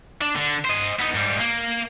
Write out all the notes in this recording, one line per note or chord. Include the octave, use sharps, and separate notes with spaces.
D4
D3
C5 D#5
B3 D#4
G#2 G3
A#3